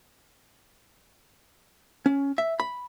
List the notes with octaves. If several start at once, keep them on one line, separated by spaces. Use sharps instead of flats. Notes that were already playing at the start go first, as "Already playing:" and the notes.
C#4
E5
B5